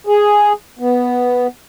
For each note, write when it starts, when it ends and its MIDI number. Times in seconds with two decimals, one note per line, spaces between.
0.07 0.53 68
0.79 1.47 59